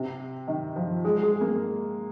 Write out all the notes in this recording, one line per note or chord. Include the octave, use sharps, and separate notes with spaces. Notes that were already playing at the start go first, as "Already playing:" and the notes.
Already playing: C3
D#3
F3
G#3
G#3
A#3